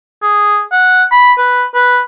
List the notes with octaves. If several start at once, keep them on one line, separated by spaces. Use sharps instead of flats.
G#4
F#5
B5
B4
B4